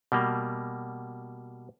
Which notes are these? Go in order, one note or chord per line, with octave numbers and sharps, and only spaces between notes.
B2 G3 A#3